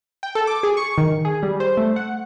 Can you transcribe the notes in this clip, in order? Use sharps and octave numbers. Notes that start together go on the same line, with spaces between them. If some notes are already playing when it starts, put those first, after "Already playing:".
G5
A4
D6
G#4
C#6
D#3
G#4
G3
C5
A3
F#5